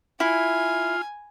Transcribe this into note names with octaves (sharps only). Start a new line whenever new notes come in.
E4 F4 G#5